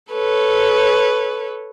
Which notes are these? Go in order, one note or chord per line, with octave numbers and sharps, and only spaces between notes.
A4 B4 C#5